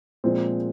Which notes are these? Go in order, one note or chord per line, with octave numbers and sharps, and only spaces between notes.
A#2 F3 G#3 C4